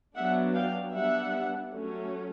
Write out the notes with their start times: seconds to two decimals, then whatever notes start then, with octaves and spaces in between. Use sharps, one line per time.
0.15 F#3 B3 D4 E5 F#5
0.55 F5 G5
0.93 G3 B3 D4 E5 F#5
1.72 F#3 A3 C#4